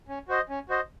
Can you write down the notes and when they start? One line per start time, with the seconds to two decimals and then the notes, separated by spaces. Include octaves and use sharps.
0.09 C#4
0.28 F#4 C5 D#5
0.49 C#4
0.69 F#4 C5 D#5